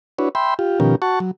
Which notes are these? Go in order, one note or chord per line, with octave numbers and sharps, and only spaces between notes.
D4 E4 F#4 B4 C#5
E5 G5 B5 C6
F4 G4
B2 D#3 F3 C#4 G4 A#4
F#4 F#5 A5 C#6
F#3